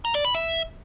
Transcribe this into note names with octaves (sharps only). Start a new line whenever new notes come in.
A#5
D5
B5
E5